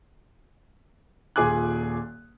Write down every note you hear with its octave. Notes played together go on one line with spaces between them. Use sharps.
D#1 A#2 G#4 G#5 D6 F#6